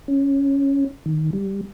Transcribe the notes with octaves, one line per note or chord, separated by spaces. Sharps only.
C#4
D#3
G3